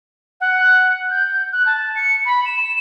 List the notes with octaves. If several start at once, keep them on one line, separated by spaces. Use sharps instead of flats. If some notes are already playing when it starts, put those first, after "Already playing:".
F#5
G6
F#6
A5
C#7
B5
E7